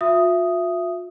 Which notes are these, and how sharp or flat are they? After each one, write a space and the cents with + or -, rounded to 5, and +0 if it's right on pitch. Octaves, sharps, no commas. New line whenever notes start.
F4 +45 E5 +20 D#6 +0